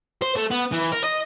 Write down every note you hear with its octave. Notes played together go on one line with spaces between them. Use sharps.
C5
A3
B3
E3
A#4
D#5